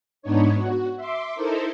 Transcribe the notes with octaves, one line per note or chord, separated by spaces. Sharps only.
G#2 B3 D4 D#4 C#5
F#4
E5 C6 D6
D#4 E4 A4 A#4 C5